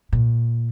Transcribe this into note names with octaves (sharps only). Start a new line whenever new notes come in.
A#2